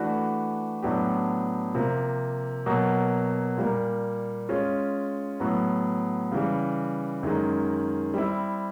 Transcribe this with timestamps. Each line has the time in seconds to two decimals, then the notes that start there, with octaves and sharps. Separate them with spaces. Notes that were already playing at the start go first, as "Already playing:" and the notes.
Already playing: E3 A3 D4 F#4 B4
0.83 A2 F#3 B3 D4 G4
1.75 C3 F3 A#3
2.66 B2 F#3 A#3
3.57 A#2 G3 A#3
4.49 G#3 C#4 F4
5.40 A2 F#3 B3
6.32 C#3 E3 G3
7.23 F#2 D#3 G#3
8.14 G3 C4 E4